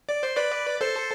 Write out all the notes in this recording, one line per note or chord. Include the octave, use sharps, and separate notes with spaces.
D5
C5
B4 D5
A4 C5